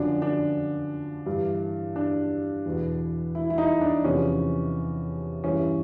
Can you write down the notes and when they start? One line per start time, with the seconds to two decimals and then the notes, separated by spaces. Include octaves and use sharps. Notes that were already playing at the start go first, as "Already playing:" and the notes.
Already playing: F#2 D3 F3 D4
0.22 D4
1.26 G2 E3
1.96 D4
2.66 E2 B2
3.35 E4
3.50 E4
3.58 D#4
3.81 D4
4.04 E2 C3 F3 C#4
5.44 G2 E3 C#4